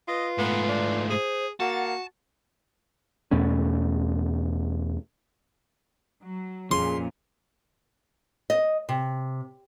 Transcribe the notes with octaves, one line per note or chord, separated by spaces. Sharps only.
F4 B4 D#5
G#2 A3 B3
D4
G#4 C5
A#3 F#4 F#5 A5
E2 B2 A3 C#4
F#3
F2 A#2 F3 C#4 F4 G#4 C6
D#5
C3